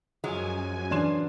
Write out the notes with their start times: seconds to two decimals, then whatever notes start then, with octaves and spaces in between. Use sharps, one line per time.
0.24 F#2 F3 F#3 G#3 G#5
0.91 E3 C#4 D4 C6 E7